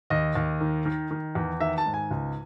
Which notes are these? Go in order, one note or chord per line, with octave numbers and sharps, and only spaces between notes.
D#2 D#5
D#2
D#3
D#3
D#3
E2
D#3 E5
A5
G#2
G#5
C#2